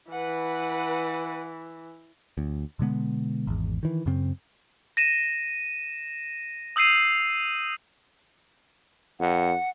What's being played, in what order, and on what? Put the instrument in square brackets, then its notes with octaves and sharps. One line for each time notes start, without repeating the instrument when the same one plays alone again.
[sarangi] E3 [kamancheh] B4 F#5
[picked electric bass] D2
B2 D3 G#3 B3
G#1 E2
D#3 E3
F#2 C#3 C4
[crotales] A#6 D#7 E7
D#6 E6 G6 C7 D#7
[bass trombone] F2 [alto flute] F#5